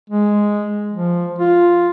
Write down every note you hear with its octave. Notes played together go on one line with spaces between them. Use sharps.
G#3
F3
F4